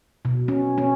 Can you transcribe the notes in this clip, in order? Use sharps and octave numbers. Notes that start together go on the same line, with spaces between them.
B2
C#4
C#4